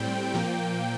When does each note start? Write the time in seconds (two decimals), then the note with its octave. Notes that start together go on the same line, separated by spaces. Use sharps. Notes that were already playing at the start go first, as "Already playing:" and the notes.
Already playing: A2 G3 C4 G5
0.33 A#2 F3 A#3